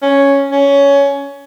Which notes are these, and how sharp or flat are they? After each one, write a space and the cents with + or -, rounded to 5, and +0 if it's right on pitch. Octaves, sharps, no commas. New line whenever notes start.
C#4 +0
C#4 +15